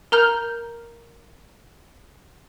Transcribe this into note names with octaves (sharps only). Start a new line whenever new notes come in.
A#4 A#5 F6 G6